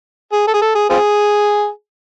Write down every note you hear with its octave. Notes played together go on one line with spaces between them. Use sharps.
G#4
A4
G#4
A4
G#4
C4 F4 G#4